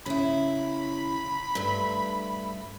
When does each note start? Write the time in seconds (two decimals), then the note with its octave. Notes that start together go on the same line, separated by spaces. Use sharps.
0.06 C#3 E4 B5
1.55 G2 A3